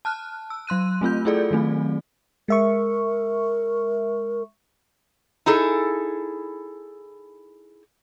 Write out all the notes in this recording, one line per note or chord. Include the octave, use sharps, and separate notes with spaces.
A5 F6 F#6
E6
F#3 C6 F#6 D#7
A3 C4 F4 G6
E4 F4 G#4 A4 D5
D#3 F#3 A3 C4
G#3 A#4 E5 C#6
D#4 E4 G#4 A4